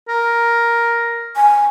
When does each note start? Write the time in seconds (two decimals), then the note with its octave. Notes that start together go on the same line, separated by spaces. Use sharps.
0.08 A#4
1.36 G#5